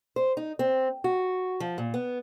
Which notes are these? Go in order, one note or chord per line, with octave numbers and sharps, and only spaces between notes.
C5
D#4
C4
F#4
F3
A#2
B3